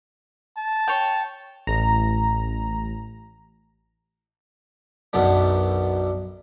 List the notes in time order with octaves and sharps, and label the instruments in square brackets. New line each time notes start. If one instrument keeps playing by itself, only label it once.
[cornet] A5
[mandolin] C#5 G5
[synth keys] A1 A#5
[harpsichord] B1 F#2 B3 D4